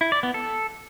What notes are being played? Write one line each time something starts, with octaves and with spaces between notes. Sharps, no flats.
E4
D5
B3
A4